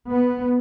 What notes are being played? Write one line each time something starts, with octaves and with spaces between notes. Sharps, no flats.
B3